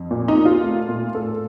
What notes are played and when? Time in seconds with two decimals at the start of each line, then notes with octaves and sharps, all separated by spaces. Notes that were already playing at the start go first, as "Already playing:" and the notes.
Already playing: F2
0.11 A#2
0.28 D#4
0.36 A#2
0.45 F4
0.63 A3
0.89 A#2
1.15 A2 A4